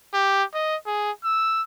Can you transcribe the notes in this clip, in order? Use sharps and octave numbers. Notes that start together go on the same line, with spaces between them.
G4
D#5
G#4
E6